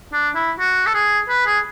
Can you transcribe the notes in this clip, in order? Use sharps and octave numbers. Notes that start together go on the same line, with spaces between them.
D4
E4
F#4
A4
G#4
B4
G#4